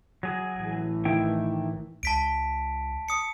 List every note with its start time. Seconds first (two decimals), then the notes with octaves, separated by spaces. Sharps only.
0.23 F#3 G#4
0.56 A1 E3 A3
1.05 D#3 E4 G5
2.03 C#2 A5 B6 D7
3.08 D#6 C#7